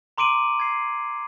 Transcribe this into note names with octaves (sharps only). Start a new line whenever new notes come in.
A#5 C6 D6 D7 D#7 F#7
G#6 C7